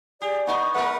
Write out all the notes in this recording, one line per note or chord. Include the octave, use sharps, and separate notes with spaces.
G4 G#4 D5
B3 D4 D#4 C#6
G#3 B3 A#4 B4 F#5